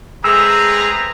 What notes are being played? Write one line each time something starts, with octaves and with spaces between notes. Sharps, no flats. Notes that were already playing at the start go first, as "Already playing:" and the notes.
G#3 A3 C4 G#4 B4 A#5 E6